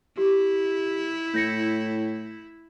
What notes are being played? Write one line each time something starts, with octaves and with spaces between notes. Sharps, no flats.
E4 G4
A2 G6 A#6 C#7